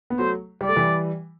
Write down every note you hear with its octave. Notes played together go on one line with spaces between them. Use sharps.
B3
F#3 A3 C5
G3 D5
A3
E3 G3